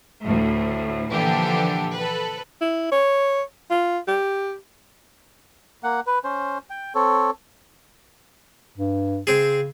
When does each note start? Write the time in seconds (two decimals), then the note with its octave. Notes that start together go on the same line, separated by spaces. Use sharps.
0.24 D2 A2
1.10 A#2 D3 E3 F3 D4 G4
1.95 A4 B4
2.61 E4
2.92 C#5
3.70 F4
4.07 G4
5.83 A#3 F#5
6.07 B4
6.24 C#4 C5
6.70 G5
6.95 C4 A4 C#5
8.78 G2
9.27 C#3 C4 G#4